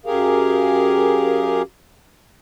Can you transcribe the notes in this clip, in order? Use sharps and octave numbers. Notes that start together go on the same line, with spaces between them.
F#2 G4 G#4 A#4 F5